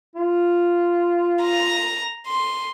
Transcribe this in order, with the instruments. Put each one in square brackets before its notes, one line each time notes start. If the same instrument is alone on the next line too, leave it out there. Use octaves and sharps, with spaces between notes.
[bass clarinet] F4
[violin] A#5
C6